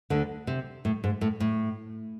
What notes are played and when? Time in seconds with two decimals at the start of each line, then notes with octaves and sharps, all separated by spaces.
0.10 D2 D3
0.47 C3
0.85 A2
1.04 G#2
1.21 A2
1.40 A2